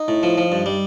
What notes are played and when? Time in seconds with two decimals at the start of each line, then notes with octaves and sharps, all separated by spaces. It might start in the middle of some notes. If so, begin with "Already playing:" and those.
Already playing: D#4
0.08 A2
0.23 F3
0.38 F3
0.52 G2
0.66 G3